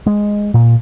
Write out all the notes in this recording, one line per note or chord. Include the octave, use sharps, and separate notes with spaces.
G#3
A#2